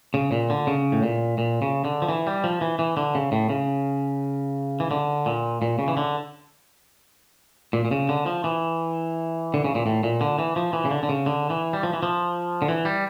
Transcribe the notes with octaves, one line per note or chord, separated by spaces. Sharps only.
C#3
A#2
D3
C#3
A2
A#2
A#2
C#3
D3
F3
E3
G3
F3
E3
E3
D3
C#3
A2
C#3
E3
D3
A#2
A#2
C#3
E3
D3
A#2
A#2
C#3
D3
F3
E3
D3
C#3
A#2
A2
A#2
D3
E3
F3
E3
C#3
D3
D3
C#3
D3
E3
G3
F3
E3
F3
D3
E3
G3